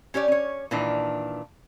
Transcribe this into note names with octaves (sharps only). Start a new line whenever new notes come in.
C#4 G4 C#5 D5
C#4 C#5
A#2 D#3 E3 D4